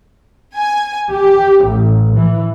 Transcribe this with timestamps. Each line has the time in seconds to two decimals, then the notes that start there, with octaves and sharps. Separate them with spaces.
0.57 G#5
1.12 G4
1.66 A1
2.18 E3